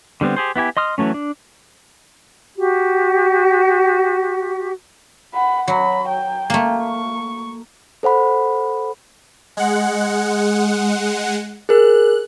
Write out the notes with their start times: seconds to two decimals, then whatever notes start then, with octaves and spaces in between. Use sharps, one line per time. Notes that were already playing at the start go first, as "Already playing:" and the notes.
0.21 D3 G3 B3 C4
0.36 G4 G#4 C5
0.56 B3 E4 G4 G#5
0.77 D#5 C6 D#6 F6
0.98 E3 F#3 A3 C#4
1.14 D4
2.57 F#4 G4
5.34 F#5 B5
5.68 F#3 B5
6.09 G5
6.50 A3 A#3
6.83 C#6
8.03 A4 C5 F#5 B5
9.57 G#3 F#5
11.69 G#4 A#4 F#6